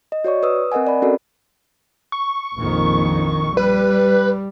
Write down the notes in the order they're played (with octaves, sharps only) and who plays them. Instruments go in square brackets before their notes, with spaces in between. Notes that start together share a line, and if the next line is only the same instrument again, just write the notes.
[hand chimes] D#5
F#4 C#5 D5 C#6
B4 D#6 E6
C4 A#4 D#5 F#5 G#5
D5 B5
C4 C#4 F#4 A4 A#4 D5
[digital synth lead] C#6
[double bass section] A#1 F2 D#3
[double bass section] G3 [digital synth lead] B4